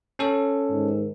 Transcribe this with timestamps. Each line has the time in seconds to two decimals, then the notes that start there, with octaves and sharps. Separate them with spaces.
0.19 C#4 A4
0.70 G#2 D#3